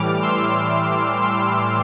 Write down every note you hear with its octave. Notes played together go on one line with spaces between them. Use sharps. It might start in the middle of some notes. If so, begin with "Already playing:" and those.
Already playing: A2 E3 G3 D6 F6
C6 E6
C6 E6